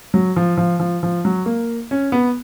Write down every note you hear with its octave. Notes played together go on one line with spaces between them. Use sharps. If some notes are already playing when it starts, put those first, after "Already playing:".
F#3
F3
F3
F3
F3
F#3
A#3
C#4
B3